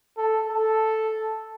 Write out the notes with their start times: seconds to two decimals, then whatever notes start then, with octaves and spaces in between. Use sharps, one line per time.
0.17 A4
0.49 A4